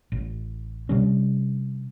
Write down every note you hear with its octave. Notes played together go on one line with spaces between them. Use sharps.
A1
C3 G3 C#4